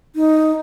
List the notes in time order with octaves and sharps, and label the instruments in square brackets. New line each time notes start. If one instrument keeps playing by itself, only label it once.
[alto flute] D#4